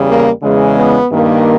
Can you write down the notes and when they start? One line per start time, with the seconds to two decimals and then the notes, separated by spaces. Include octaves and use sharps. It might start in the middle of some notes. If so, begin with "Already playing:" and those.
Already playing: E2 C#3 G3
0.09 A#3
0.43 E2 C#3 E3 G#3
0.77 B3
1.11 G2 D#3 A#3